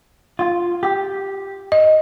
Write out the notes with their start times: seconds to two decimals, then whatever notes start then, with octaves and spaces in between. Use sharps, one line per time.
0.39 F4
0.83 G4
1.72 D#5